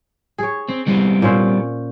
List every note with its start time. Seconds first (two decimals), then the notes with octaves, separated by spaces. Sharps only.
0.38 G#4 C#5
0.69 C4
0.87 G3 B3 C4
1.22 A#2 C#4 C5